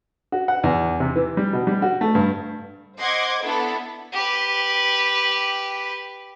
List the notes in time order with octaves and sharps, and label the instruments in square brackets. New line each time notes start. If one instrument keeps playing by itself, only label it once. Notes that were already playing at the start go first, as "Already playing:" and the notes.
[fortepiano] F#4
F#5
E2
C3
E3
G3
B2
G3
F#4
A3
G2
[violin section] C5 D#5 F#5 C6 D6 G#6
B3 D4 E4 A4
[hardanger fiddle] G4 B4